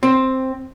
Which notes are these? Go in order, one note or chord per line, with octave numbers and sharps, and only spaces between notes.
C4